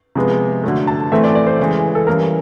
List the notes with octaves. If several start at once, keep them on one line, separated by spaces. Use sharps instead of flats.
C3 F3 G#3 B3
D3 F#3 A3
A5
A2 E3 A3 C4 E5
D5
D5
C5
C#3 E3 G#3
A4
E3 G3 A#3 C#4 A#4